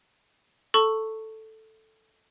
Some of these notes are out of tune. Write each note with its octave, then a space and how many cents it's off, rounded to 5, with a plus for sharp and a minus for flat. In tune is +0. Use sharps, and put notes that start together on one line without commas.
A4 +0 A5 +20 C#6 +0